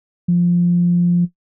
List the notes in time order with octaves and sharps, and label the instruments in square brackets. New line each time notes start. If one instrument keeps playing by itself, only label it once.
[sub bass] F3